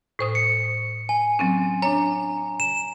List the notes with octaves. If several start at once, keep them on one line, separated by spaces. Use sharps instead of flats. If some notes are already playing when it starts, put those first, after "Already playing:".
A2 C5 D#6
C#7
G#5
F#3 C4 C#4
D4 C#5 A#5
E7